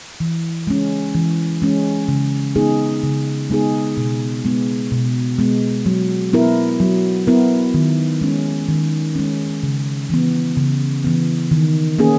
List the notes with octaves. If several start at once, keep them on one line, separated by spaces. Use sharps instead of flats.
E3
G#3 C#4
E3
G#3 C#4
C#3
G#3 B3 D#4 G#4
C#3
G#3 B3 D#4 G#4
B2
G#3 B3
B2
G#3 B3
F#3
B3 E4 A#4
F#3
B3 E4 A#4
D#3
G#3 C#4
D#3
G#3 C#4
C#3
E3 B3
C#3
E3 B3
D#3
A#3 C#4 G#4